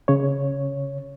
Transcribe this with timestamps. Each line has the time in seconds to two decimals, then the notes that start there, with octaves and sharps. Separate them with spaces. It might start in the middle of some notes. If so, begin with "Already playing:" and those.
0.08 C#3 C#5